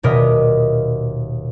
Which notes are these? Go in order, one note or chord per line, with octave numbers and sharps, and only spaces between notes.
D#1 B2 A#4 D#5 B6